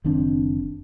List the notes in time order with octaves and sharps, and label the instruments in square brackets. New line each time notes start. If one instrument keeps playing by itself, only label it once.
[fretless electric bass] F#1 D#3 C4 D4